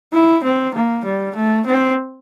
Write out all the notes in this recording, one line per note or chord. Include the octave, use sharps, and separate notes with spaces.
E4
C4
A#3
G3
A3
C4